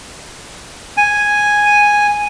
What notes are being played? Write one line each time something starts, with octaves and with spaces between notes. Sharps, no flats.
G#5